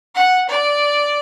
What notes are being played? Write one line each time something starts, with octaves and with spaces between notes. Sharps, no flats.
F#5
D5